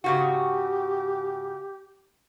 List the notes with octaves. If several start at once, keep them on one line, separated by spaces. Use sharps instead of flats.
G#2 C#3 F#4 G4